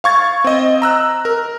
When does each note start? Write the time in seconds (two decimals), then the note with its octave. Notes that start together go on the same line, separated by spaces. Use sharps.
0.04 F5 C#6 G#6 A6
0.44 C4 D#5
0.82 A#5 E6 F#6
1.25 A#4